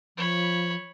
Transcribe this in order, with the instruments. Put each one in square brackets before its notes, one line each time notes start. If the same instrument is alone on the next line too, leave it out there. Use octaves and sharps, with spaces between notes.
[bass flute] F3 [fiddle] C#5 B5